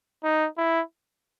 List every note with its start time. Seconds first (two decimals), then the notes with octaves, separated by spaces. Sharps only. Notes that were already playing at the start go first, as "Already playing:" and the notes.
0.24 D#4
0.58 E4